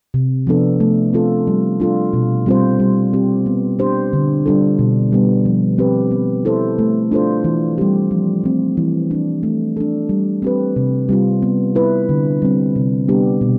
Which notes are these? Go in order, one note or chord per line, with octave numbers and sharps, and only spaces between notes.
C3
F3 B3 D4 A4
A3
C4 F4 A4
G3
D4 F4 A4
B2
G3 C4 F4 C5
G3
C4 G4
B3
D4 G4 C5
D3
G3 D4 F4 A4
B2
G3 B3
F3
C4 G4 B4
B3
E4 A4 C5
A3
D4 F4 A4 C5
E3
G3 C4 G4
F3
A3 C4
E3
G3 D4
A3
D4 A4
G3
C4 G4 B4
C3
G3 C4 F4
B3
E4 B4
D3
G3 C4
C3
G3 B3 D4 G4
B2